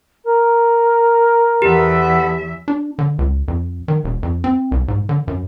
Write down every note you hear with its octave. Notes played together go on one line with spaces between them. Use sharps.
A#4
E2 B3 G4 A4 B4 E5
D4
D3
C#2
F2
D#3
E1
F2
C4
C2
G#2
D3
F#2